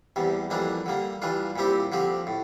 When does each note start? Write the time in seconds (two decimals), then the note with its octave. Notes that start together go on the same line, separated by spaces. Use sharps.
0.16 E2 C3 G3
0.50 F2 E3 G3 A#3 D4
0.86 D3 G3 A#3
1.22 E3 G3 D4 F4
1.56 A#2 G3 C4 E4 G4
1.92 D3 F3 C4 G4
2.27 A2